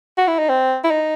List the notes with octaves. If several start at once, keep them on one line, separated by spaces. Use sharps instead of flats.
F#4
E4
D#4
C4
E4
D#4